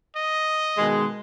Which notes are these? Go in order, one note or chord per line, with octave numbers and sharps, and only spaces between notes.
D#5
B2 D#3 G#3